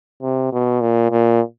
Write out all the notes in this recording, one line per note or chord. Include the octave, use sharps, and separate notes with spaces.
C3
B2
A#2
A#2